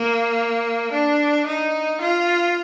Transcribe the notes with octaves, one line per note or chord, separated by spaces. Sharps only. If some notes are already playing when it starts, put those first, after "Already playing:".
Already playing: A#3
D4
D#4
F4